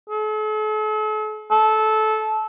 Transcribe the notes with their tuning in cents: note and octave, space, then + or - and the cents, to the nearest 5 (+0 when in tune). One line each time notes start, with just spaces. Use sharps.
A4 -45
A4 -20